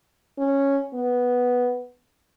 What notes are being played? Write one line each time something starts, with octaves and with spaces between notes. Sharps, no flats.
C#4
B3